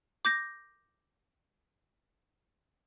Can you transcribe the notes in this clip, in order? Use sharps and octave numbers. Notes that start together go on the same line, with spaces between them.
D6 G6 A#6